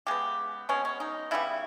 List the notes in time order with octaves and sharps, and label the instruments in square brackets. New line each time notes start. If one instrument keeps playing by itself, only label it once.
[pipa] C#3 G#3 B3 G4
B2 G#3 B3 C#4
C#4
D#4
C#3 G3 B3 E4